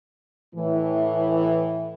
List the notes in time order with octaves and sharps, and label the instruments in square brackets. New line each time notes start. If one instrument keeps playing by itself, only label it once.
[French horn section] A2 E3